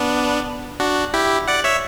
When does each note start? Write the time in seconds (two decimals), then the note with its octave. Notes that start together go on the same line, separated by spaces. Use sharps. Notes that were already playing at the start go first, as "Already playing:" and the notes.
Already playing: B3 D4
0.80 D4 F#4
1.14 E4 G4
1.48 D5 F#5
1.64 C#5 E5